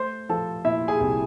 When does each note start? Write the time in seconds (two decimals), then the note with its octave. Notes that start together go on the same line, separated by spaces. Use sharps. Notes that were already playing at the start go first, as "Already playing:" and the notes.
Already playing: A3 C5 C6
0.29 F3 A4 A5
0.65 A#2 E4 E5
0.88 G#4 G#5
1.00 C2